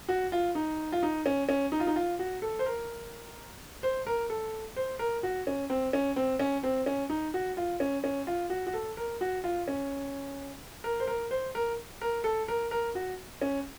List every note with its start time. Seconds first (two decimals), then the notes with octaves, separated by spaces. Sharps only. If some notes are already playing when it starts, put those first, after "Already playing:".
0.09 F#4
0.32 F4
0.55 D#4
0.92 F4
1.03 D#4
1.26 C#4
1.49 C#4
1.72 D#4
1.80 F4
1.87 D#4
1.96 F4
2.19 F#4
2.42 A4
2.59 C5
2.66 A#4
3.83 C5
4.06 A#4
4.30 A4
4.76 C5
4.99 A#4
5.23 F#4
5.47 C#4
5.70 C4
5.93 C#4
6.16 C4
6.40 C#4
6.63 C4
6.86 C#4
7.10 D#4
7.34 F#4
7.57 F4
7.80 C#4
8.04 C#4
8.27 F4
8.50 F#4
8.67 F#4
8.74 A4
8.97 A#4
9.21 F#4
9.44 F4
9.68 C#4
10.84 A#4
11.00 C5
11.07 A#4
11.31 C5
11.55 A#4
12.01 A#4
12.24 A4
12.48 A#4
12.71 A#4
12.95 F#4
13.42 C#4